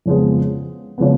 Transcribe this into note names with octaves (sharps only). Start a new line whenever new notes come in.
F2 C#3 F3 G#3 B3
C#3 F3 G#3 B3